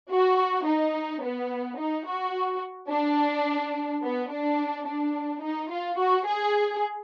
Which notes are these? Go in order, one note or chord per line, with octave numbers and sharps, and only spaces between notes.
F#4
D#4
B3
D#4
F#4
D4
B3
D4
D4
D#4
F4
F#4
G#4